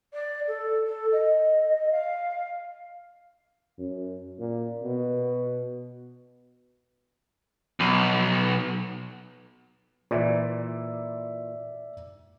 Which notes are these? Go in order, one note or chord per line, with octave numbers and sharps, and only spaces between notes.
D5
A4
A4
D#5
F5
F#2
A#2
B2
B1
A#2 E3 D5 E5